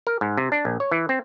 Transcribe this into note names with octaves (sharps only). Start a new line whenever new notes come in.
A#4
G#2
C3
D4
A#1
C#5
E3
C4